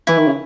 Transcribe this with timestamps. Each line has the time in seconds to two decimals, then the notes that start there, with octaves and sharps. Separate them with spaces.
0.07 E3 E4
0.18 D#3
0.27 C#3